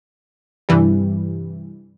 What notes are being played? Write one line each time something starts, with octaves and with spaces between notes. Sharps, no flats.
G2 C3 E3 G3